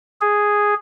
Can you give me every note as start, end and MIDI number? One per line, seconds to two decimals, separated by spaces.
0.21 0.74 68